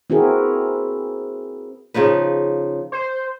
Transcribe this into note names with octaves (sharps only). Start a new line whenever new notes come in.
C4 E4 F#4 G#4 A#4 B4
C#3 F3 D#4 B4
C5